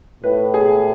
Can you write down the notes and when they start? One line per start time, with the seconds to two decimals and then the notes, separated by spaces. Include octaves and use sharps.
0.23 A2 B4
0.54 G#4